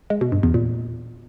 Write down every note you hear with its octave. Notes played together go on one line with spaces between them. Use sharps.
G#3
B2
G2
E2
A#2